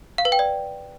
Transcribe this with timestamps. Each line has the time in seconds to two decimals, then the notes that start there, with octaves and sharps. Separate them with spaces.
0.18 F5
0.25 B4
0.32 G5
0.39 D5